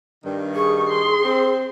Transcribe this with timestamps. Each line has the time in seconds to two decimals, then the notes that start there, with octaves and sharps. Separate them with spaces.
0.22 G2 D#3
0.55 G#4 C#6
0.88 C6
1.23 C4